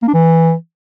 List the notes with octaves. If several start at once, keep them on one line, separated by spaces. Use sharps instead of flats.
A#3
D4
E3